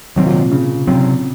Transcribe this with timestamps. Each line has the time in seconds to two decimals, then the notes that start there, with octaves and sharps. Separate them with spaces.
0.16 C3 D#3 F#3 C4
0.26 A#2
0.35 C3
0.52 C#3
0.88 C3 F#3 C4